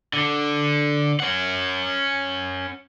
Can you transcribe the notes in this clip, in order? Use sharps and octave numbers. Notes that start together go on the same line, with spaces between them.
D3
C#4 F#5